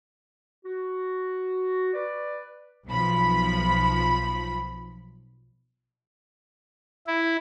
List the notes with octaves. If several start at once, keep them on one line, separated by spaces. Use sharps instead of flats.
F#4
B4 D5
B1 F3 B5
E4